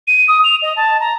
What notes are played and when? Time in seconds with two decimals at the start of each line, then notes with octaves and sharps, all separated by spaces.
0.07 D#7
0.28 D#6
0.44 F7
0.62 D#5
0.76 A5
1.00 A#5